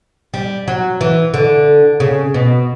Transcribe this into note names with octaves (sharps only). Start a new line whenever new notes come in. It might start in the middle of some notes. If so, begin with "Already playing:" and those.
G3
F#3
E3
D3
C#3
B2